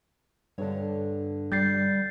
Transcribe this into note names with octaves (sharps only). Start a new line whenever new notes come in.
G2 D3 D4 A4 C#5
G3 G6 A6 C7